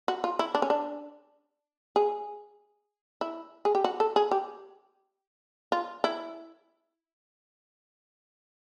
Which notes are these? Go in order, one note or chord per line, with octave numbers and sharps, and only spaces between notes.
F#4
F4
E4
D4
C#4
D4
G#4
E4
G#4
G4
F#4
A4
G#4
G4
F4
E4